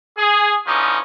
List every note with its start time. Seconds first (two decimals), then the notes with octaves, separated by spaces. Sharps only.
0.17 G#4
0.67 D3 E3 F3 C#4 D#4